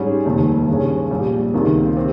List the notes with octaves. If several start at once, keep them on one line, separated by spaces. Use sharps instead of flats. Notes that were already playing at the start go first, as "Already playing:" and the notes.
Already playing: G#2 G3 C#4 G#4
F1 D#2 D#3
G2 D#3 G#3 C#4
A#1 A#2 G3
C#2 C3 D#3 A#3
C4 G4